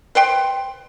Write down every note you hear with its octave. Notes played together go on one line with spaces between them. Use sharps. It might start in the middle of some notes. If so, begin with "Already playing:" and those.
B4 C5 G5 C6